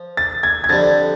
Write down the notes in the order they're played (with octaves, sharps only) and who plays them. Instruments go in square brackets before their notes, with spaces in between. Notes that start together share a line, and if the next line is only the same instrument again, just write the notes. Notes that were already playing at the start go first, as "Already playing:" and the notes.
Already playing: [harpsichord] F3
[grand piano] A6
G#6
G#6
[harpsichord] F2 D3 G3 [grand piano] A6